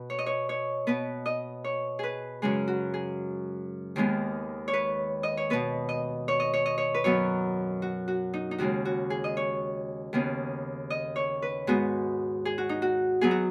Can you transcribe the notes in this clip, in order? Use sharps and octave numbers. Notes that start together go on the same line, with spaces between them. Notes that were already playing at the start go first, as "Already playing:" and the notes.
Already playing: B2 B4
C#5
D#5
C#5
C#5
B2 B3 B4
D#5
C#5
G#4 B4
F#2 C#3 G#3 G#4
F#4
G#4
D#2 D#3 G#3 B3
C#5
B4
D#5
C#5
B2 B3 B4
D#5
C#5
D#5
C#5
D#5
C#5
B4
F#2 F#3 B3 C#5
F#4
F#4
D#4
D#4
D#2 C#3 G#3 F#4
F#4
G#4
D#5
C#5
D#2 C#3 B3
D#5
C#5
B4
G#2 G#3 B3 F#4
G#4
F#4
D#4
F#4
F#3 B3 G#4
F#4